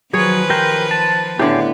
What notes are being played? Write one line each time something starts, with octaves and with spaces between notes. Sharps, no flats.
D#3 F3 F#3 G#4 B4 C#5
G4 A#4 C5 G5
A5
A2 D3 B3 G4 G#4 D5